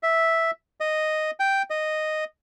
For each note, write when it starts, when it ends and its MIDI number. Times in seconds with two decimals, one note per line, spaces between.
0.03 0.51 76
0.80 1.31 75
1.40 1.62 79
1.70 2.24 75